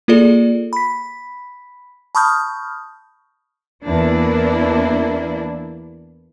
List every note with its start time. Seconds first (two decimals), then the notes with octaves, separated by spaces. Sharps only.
0.08 A#3 F4 G#4 A4 D5
0.73 B5 B6
2.15 A5 B5 C#6 D#6 F6 G6
3.83 E2 A#3 D4 E4